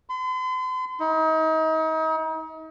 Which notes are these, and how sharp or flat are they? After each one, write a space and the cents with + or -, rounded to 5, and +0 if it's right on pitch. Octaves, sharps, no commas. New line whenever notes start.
C6 -45
D#4 +35